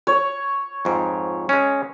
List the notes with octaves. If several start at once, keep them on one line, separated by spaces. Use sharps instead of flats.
C#5
F2 G#2
G#3 C#4